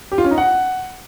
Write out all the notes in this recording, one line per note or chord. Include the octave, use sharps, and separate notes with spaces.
G4
F4
C#4
D#4
F#5